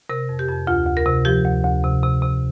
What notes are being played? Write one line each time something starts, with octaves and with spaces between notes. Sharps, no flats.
C3 A#4
F2
G4
F2
D2 F4
D2
A#4
C3
F3 G4
D2
D2
C3
C3
C3